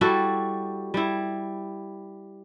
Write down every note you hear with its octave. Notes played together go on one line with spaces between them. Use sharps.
G3 E4 F#4 A4
G3 E4